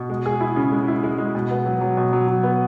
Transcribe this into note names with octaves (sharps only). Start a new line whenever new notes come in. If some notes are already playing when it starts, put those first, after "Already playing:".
Already playing: B2
G#3
G#4
E4
C#3
G#3
E4
G#3
G#3
B2
B3
F#3
F#3
B2
F#3
F#3
B3